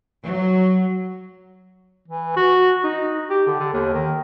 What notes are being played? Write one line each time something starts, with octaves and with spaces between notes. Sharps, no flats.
F#3
E3
F#4
D#4
G4
D3
D3
D#2
D#3